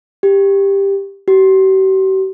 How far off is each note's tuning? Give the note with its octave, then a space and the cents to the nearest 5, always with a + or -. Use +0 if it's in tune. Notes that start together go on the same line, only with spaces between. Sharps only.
G4 +10
G4 -45